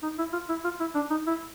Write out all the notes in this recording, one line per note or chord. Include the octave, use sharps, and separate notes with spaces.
D#4
E4
F4
E4
F4
E4
D4
D#4
E4